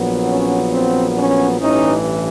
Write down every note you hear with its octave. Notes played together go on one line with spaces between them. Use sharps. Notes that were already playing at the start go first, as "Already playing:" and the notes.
Already playing: A#1 A#2 F#3 B3
C#4
C4
C#4
A1 G2 E3 C#4 D#4